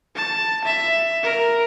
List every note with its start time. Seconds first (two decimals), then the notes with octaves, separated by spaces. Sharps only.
0.15 A5
0.65 E5
1.23 A#4